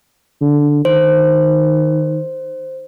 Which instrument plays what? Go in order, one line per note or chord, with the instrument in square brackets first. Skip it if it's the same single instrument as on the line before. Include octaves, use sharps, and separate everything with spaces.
[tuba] D3
[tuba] D#3 [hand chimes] C5